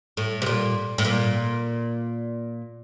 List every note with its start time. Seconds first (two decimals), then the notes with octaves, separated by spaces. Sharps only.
0.17 A2
0.42 C3
0.46 A#2
0.98 A2
1.05 A#2